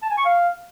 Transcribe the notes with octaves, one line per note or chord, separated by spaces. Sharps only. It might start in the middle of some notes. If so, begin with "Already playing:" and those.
A5
G#5
C#6
F5